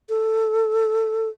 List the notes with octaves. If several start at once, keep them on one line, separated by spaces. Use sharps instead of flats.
A4